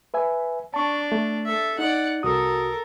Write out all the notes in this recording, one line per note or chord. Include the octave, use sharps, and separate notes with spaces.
B4 E5 G#5
D4 A5 C#6
A3
A4 E5
D#4 D5 F#5
C2 F#4 A4 A#4 D#6